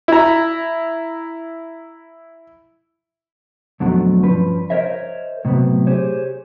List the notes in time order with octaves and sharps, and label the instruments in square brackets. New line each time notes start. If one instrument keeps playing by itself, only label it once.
[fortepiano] E4 A#5
[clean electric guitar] F2 B2 D3 F#3 G3 A3
G2 F3 C#4 B4
A#4 C5 C#5 D#5 E5
A2 C3 F#3 B3
G4 G#4 C5 C#5